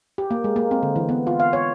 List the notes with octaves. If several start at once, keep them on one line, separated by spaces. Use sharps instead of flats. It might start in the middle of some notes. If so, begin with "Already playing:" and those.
G4
A#3
G#3
A#3
C4
D3
E3
B3
F4
F5
C#5